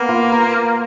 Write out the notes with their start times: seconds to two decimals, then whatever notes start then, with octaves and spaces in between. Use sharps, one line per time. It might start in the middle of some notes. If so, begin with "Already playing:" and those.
Already playing: A#3 B3
0.09 F4
0.32 A#4